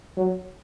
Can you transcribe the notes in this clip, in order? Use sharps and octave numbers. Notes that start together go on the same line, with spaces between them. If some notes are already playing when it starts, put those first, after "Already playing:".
F#3